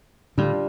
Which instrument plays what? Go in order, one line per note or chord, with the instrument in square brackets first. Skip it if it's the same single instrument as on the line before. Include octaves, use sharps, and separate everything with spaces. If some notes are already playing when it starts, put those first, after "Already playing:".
[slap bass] A2 D3 [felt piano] G3 D4 F4